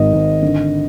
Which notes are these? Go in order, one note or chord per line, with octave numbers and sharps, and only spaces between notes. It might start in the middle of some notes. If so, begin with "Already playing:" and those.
Already playing: G#1 G#2 D#5
G#1
D3